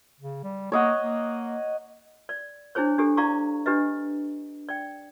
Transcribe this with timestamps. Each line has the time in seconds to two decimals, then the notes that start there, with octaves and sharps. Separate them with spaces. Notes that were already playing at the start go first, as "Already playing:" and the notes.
0.21 C#3
0.44 G3
0.72 A#3 C#5 D#5 F#5
1.02 A#3
2.29 D5
2.75 D4 E4 G#4 C5 C#5
2.98 D4 G4 A4
3.17 E4 D5 F5 A#5 C#6 D6
3.66 D4 G4 B4 D#5
4.69 D5 G5